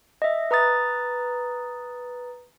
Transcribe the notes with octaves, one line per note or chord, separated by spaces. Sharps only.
D#5 E5
B4 A#5 D#6 A6